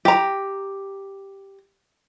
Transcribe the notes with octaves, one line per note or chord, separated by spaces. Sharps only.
G4 A#5